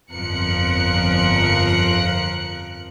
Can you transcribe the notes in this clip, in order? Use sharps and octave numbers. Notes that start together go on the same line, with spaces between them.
G1 F2 F3 A#4 F#6 C#7